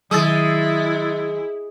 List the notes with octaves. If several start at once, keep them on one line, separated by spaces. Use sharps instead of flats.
D#3 F#3 G#3 E4 D#6 E6 A6